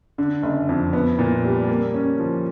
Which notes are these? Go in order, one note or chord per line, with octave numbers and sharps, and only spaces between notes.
D3
F#1
F2
B3
A#2
G3
A#3
C#4
F3